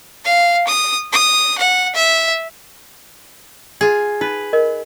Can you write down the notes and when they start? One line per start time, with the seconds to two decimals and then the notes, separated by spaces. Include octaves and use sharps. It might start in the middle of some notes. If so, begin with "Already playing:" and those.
0.25 F5
0.68 D#6
1.12 D#6
1.58 F#5
1.95 E5
3.81 F4 G#4
4.21 D#4 B4
4.53 A#4 D#5